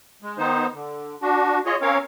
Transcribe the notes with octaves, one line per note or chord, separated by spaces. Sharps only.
G#3
D#3 B3 D#4 C5
D3
D4 F#4
F4 G#4 C#5 D#5
C4 C#4 A#4 C#5 F5